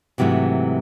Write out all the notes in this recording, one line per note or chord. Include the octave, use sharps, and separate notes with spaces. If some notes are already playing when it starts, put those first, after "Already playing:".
G#2 C3 E3 F#3 A3